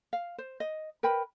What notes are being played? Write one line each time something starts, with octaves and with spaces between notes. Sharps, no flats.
F5
C5
D#5
A#4 B4 G5 B5